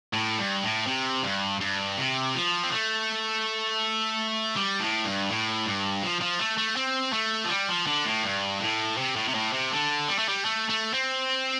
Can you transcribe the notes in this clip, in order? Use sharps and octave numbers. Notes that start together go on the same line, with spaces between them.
A2
G2
A2
C3
G2
G2
C3
F3
C4
A3
G3
A2
G2
A2
G2
F3
F3
A3
A3
C4
A3
F3
G3
F3
D3
A2
G2
A2
C3
A2
C3
A2
C3
D3
G3
A3
G3
A3
A3
C4